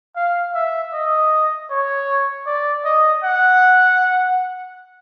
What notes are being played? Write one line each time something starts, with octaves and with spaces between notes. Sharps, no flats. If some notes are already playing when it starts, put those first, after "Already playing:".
F5
E5
D#5
C#5
D5
D#5
F#5